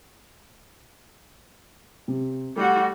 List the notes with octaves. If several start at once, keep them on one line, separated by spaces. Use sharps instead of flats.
C3
G3 A3 F#4